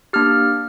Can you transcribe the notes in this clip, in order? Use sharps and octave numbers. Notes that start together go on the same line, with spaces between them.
A#3 D4 G4 F6